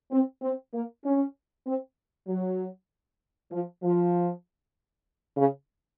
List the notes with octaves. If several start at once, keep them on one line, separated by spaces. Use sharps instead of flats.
C4
C4
A#3
C#4
C4
F#3
F3
F3
C#3